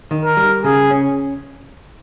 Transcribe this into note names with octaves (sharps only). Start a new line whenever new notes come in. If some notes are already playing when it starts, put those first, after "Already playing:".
D#3
A#4
G3
C#3 G#4
C#4